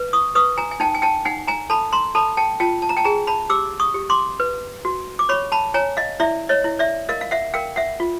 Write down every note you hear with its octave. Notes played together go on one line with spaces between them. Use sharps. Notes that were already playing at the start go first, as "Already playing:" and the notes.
Already playing: B4
C#6 D#6
B4 C#6 D#6
G#5 A#5
G#5
D#4 G5 A5
G#5
G5 A5
D#4 F#5 G#5
G#5 A#5
A4 A5 B5
A#5 C6
A4 A5 B5
G5 A5
F4 G5 A5
A5
A#5
G5 A5
G#4 G#5 A#5
A5 B5
G4 D6 E6
C#6 D#6
G4
C6 D6
B4
F#4
D6
C#5 B5 C#6
A5 B5
C#5 G#5 A#5
D#5 F5
E4 D5 E5
C#5 D#5
E4
D5 E5
A#4 D#5 F5
F5
E5 F#5
A#4 F5 G5
E5 F#5
F4